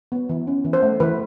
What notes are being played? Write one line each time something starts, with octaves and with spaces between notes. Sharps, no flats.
B3
E3
C#4
E3
C5
A3
E3 B4